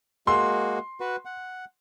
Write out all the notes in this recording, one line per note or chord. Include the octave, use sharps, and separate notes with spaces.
G#3 A#3 F#4 C6
F#4 B4
F#5